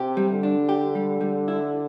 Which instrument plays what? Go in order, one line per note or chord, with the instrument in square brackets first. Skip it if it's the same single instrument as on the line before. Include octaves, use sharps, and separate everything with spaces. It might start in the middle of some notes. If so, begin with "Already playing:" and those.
Already playing: [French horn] C3 [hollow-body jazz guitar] G4
[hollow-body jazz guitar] G3
[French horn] D3
[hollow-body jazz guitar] D4
G4
G3
G3
E4